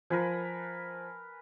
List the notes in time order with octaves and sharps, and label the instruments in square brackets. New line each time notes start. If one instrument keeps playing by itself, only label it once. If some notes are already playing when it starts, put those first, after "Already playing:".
[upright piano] F3 [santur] A#4 B4 G#5